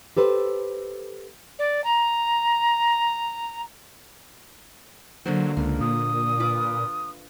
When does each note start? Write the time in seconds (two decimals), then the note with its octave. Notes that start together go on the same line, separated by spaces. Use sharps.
0.17 G4 A4 B4 C5
1.58 D5
1.84 A#5
5.26 D3 F#3 A#3 C5
5.57 C#2 A#3
5.81 A#2 D#6
6.40 F4 B4 D6